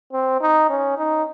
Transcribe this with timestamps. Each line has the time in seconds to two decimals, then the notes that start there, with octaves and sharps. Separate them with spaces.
0.13 C4
0.41 D#4
0.69 C#4
0.98 D#4